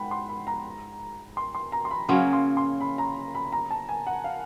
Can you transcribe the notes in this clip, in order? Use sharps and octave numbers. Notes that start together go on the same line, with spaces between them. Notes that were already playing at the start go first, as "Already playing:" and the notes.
Already playing: G#2 F#5 G5 B5
C6
B5
A#5
C6
C6
A#5
C6
B5
C#3 F#3 A#3 C#4 C6
C6
C6
B5
A#5
B5
A#5
A5
G#5
F#5
F5